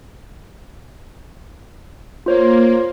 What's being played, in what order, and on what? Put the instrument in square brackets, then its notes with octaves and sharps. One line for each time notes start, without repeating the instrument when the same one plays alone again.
[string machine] A#3 [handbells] F4 C5 C#5